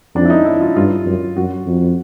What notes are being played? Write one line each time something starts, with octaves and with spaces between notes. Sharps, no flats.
F2 D4
E4
D#4
E4
F4
G2 F4
F#2
F#2 F#4
F2